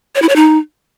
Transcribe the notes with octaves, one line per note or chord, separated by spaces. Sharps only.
C#5
E4
C#5
D#4